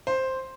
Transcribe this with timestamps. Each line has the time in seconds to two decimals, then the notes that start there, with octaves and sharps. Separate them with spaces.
0.07 C5